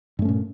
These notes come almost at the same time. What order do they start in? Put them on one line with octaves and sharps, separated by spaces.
G2 A3 C#4 A#2